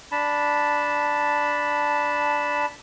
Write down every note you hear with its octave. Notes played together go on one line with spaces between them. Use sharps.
D4 A5 B5